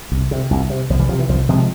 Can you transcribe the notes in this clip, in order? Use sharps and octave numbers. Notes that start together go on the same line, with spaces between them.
C2
C3
C2
C3
C2 F3
E3 G3
C3 F3
E3
C2 F3
C3 F3 G#3